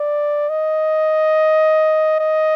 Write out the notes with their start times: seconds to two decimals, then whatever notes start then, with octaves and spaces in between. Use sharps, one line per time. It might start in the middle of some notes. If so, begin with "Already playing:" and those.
Already playing: D5
0.49 D#5
2.20 D#5